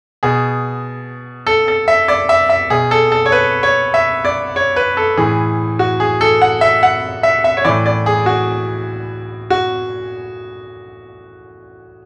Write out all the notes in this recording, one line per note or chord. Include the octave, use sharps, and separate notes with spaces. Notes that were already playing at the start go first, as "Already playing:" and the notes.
B2 G#4
A4
A4
E5
D5
E5
E5
B2 G#4
A4
A4
C#5
B4
C#5
E5
D5
C#5
B4
A4
A2 E3 G#4
F#4
G#4
A4
F#5
E5
F#5
E5
E5
C#5
A2 E3 D5
D5
G#4
F#4
F#4